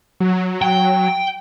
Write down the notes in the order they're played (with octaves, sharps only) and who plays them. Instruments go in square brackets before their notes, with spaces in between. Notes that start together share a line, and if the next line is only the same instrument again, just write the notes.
[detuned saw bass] F#3
[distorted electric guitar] G5